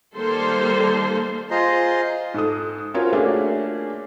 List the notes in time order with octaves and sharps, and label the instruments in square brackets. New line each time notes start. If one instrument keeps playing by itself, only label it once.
[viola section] D#3 G3 A#3 A4 C5 C6
[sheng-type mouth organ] F4 G#4 C5 D#5 A#5 C6
[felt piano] G#2 A4 D#6
C4 C#4 F4 F#4 A#4 C#5
A3 A#3 C#4 D4 F#4 G#4